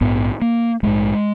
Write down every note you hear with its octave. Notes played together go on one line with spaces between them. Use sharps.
A#1 G#2 B3
A#3
A#1 G#2 G#3